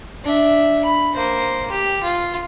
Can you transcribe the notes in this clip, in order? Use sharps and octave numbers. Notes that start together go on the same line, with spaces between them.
D4 E5
B5
A#3 C5
G4
F4